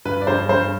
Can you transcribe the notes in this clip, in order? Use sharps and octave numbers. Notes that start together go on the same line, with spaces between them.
G2 B4
D5
G2 C5
G2 C5